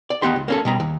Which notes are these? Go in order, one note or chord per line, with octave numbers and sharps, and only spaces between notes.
D5
D#2 C3 B3 D#4 G4 C6
C#2
A#3 C#4 A4
B2 G3 A#5
D#2